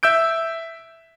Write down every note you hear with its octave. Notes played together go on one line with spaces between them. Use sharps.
E5 E6 G6 D7